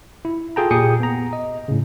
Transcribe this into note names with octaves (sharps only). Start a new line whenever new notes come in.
E4
F4 G#4 A4 G5 A5 A#5
A#2 G4 G#4 G5 D#6 C#7
B3 A#5
D#5
A2 C#3